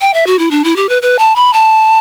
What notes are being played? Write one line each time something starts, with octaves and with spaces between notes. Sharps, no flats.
G5
E5
F#4
E4
D4
E4
G4
B4
B4
A5
B5
A5